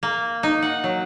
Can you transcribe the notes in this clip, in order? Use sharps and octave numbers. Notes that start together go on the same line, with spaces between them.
A#3
D#4
F#5
F#3